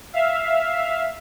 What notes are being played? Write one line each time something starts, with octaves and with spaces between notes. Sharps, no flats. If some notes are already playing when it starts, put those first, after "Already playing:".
E5 F5